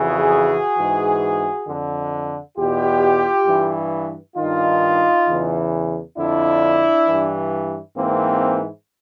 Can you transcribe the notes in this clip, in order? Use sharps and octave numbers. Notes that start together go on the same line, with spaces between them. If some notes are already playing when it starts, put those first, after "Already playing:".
Already playing: F2 C#3 E3 F#4 G#4
G#2 E3
F2 D3
E2 B2 F4 G4
G2 E3
G2 D#3 D#4 F4
E2 C#3 E3
F2 D3 D4 E4
G2 E3
G#2 E3 A#3 C4